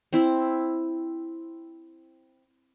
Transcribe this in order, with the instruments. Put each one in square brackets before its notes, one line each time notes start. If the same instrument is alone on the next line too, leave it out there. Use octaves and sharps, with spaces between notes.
[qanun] C4 E4